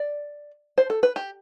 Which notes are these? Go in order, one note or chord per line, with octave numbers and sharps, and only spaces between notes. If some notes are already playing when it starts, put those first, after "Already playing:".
Already playing: D5
C5
A4
B4
G4